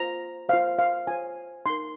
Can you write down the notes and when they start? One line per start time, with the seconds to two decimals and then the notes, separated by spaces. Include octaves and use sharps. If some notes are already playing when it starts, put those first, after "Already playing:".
Already playing: F4 C5 A#5
0.49 F4 C5 F5
0.79 F5
1.07 F4 C5 G#5
1.66 D#4 A#4 C6